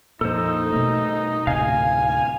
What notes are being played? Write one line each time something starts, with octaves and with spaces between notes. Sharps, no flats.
F2 A#2 D#4 A4 C5
B2 A3
D2 A2 C3 F5 G#5